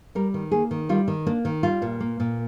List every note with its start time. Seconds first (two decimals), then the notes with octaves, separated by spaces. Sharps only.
0.15 G3 A#4
0.34 D#3
0.51 A#3 G#4
0.71 D#3
0.89 G3 F4
1.08 D#3
1.26 A#3 D4
1.45 D#3
1.63 G3 F4
1.82 A#2
2.00 A#3
2.20 A#2